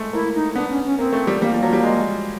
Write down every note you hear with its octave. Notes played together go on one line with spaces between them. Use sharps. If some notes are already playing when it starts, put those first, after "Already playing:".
Already playing: G#3 A3
A#3 E4
D#4
B3 D4
C#4
C#4
A#3 C4
A3
G3
G3 A#3
F3
F#3
G3
G#3